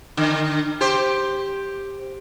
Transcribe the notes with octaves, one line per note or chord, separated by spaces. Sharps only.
D3
G4 C5